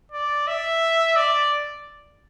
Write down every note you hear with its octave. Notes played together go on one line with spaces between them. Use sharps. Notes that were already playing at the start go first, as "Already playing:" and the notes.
D5
E5
D5